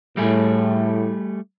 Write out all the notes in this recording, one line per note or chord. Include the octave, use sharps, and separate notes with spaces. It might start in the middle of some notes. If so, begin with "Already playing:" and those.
A2 G3 A3 G#4